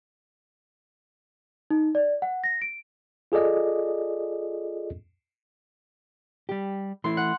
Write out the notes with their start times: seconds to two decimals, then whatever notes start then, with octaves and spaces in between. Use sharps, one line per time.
1.70 D#4
1.95 D5
2.22 F#5
2.44 A#6
2.62 D7
3.32 F4 G#4 A4 D5 D#5
6.49 G3 G4
7.04 E3 A3 E4 C6
7.17 F#5